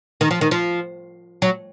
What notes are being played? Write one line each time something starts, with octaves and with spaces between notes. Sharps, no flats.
D#3
F3
D#3
F3
F#3